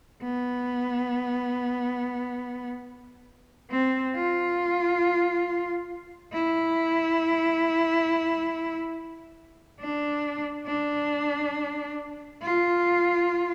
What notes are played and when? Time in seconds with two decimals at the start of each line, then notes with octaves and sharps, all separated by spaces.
0.22 B3
3.71 C4
4.15 F4
6.33 E4
9.80 D4
10.67 D4
12.42 F4